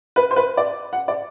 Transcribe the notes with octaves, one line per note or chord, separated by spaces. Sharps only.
B4
C5
B4
D5
F#5
D5